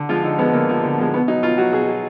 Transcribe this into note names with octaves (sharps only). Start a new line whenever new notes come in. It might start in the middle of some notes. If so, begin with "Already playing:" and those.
Already playing: D3
F3 G#3 F4
D3 D#4
F3 G#3 B3
D3 A#3
F3 G#3
D3
F3 G#3
B2 B3
F#3 D#4
B2 F4
F#3 F#4
B2 G#4
F#3